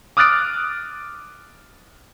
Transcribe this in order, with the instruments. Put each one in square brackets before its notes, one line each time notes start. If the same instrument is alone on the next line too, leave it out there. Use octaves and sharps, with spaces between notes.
[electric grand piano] D6 D#6 F6 F#6 A6 D7